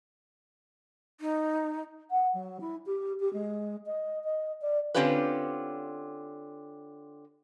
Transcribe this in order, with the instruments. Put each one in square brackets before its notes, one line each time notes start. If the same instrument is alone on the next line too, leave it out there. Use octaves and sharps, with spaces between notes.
[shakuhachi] D#4
[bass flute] F#5
F#3
E4
G4
G4
G#3
D#5
D#5
D5
[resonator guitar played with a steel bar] D3 C4 C#4 F4 G4 B4